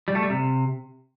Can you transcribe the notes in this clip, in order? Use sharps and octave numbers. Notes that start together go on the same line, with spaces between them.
G3
A3
G3
C3